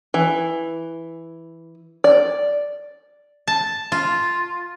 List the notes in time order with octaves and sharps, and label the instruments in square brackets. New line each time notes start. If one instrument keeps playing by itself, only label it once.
[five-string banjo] E3
D5
[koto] A5
F4